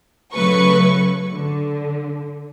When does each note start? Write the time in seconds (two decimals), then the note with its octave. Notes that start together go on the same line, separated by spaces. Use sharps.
0.33 C#3 F#3 A3 B4 C#6
1.32 D3